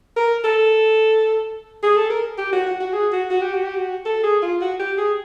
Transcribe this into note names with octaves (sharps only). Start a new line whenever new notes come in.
A#4
A4
G#4
A4
A#4
G4
F#4
F#4
F#4
G#4
F#4
F#4
G4
F#4
G4
F#4
A4
G#4
F4
F#4
G4
G#4